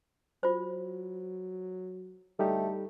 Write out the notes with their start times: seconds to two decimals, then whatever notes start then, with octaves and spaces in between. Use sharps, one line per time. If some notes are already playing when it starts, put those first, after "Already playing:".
0.43 F#3 F4 C5
2.39 D2 G3 A3 D#4 G4